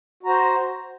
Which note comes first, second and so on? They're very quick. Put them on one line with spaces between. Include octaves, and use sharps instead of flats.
F#4 A#5 C5